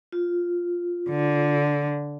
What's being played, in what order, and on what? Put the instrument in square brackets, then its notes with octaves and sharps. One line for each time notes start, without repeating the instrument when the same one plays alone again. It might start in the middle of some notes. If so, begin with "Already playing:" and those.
[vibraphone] F4
[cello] D3